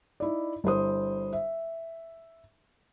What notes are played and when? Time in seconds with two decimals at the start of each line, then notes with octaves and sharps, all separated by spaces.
0.20 D#4 E4 D5
0.64 G1 E4 C5 D#6
1.33 E5